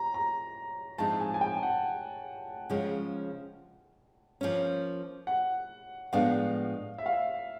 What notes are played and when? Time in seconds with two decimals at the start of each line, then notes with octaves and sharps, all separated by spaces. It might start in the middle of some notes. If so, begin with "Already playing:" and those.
Already playing: A#5
0.14 A#5
0.98 A2 F3 G#3 C4 D#4 A5
1.20 G#5
1.34 G#5
1.41 G5
1.63 F#5
2.70 C#3 F3 G#3 C#4
4.41 F3 A#3 C#4
5.27 F#5
6.13 A2 F3 G#3 B3 D4 F5
6.98 E5
7.06 F5
7.13 E5